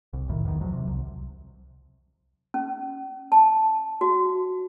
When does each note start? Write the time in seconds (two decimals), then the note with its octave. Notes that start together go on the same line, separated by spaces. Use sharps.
0.13 C2
0.28 F1 B1 A2 D#3
0.45 E2 D#3
0.60 E2 F3 F#3
0.73 C3
0.87 C2
2.54 C#4
3.32 A5
4.01 F#4